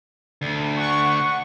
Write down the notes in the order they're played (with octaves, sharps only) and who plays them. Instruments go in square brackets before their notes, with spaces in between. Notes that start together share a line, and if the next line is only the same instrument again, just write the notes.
[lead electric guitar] D2
[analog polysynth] F#5 C#6